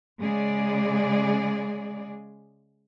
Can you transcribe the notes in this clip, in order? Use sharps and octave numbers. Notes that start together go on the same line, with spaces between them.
C#3 G#3 G#4 D5